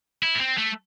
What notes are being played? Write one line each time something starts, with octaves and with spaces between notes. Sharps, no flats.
E4
A3
C4
A3